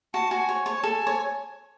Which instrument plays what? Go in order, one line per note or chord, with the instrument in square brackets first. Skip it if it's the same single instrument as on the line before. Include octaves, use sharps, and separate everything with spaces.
[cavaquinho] F#4 [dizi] A5
[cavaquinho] F#4 [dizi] G#5
[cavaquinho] C#5
[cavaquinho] C#5 [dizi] A5
[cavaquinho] A4 [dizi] G#5
[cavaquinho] C#5